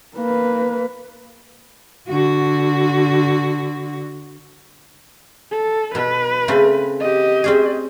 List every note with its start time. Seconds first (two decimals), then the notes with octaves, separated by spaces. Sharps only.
0.15 A#3 B4
2.09 D3 F#4
5.51 A4
5.95 B2 B4
6.48 C#3 A3 C4
7.00 G4 D#5
7.44 C4 C#4 G#4